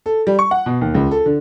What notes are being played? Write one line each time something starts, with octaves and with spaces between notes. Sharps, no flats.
A4
G3
C#6
F#5
B2
D#2
C#2
A4
D3